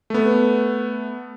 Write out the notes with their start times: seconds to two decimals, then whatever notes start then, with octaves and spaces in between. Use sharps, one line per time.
0.10 A3 B3